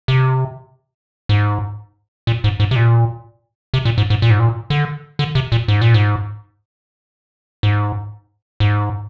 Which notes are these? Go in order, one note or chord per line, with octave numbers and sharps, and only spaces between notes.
C3
G#2
A#2
G#2
G#2
C3
A#2
C3
A#2
G#2
G#2
A#2
G#2
A#2
D3
D3
C3
A#2
G#2
A#2
G#2
G#2
G#2